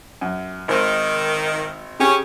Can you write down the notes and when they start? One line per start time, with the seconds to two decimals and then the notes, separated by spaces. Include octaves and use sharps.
0.21 F#2
0.68 G#1 D#3 C5
2.00 C#3 C#4 G4